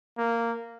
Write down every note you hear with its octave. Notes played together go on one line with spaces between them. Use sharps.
A#3